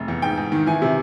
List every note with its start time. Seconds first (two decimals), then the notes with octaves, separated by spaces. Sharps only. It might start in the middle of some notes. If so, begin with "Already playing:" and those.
Already playing: F1
0.08 E2
0.22 G#2 G5
0.38 G#2
0.52 D#3
0.66 E3 G#5
0.82 C3